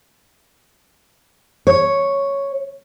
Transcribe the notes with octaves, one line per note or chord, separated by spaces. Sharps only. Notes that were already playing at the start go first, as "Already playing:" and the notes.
C#5